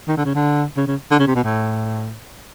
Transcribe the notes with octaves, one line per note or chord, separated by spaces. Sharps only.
D#3
D3
C#3
D3
C#3
C#3
D3
C#3
C3
B2
A2